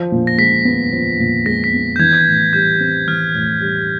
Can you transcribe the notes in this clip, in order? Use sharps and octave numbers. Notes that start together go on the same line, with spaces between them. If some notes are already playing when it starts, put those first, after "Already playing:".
Already playing: F3
A#2
A#6
G#3 B6
B3
F3
A#2
G#3 A#6
B6
B3
G6
E3 G#6
A2
G3 G6
C4
E3 F6
A2
G3